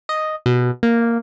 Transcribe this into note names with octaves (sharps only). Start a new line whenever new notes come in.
D#5
B2
A#3